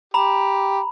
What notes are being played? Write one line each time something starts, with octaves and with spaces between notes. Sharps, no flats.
G4 A#5 B5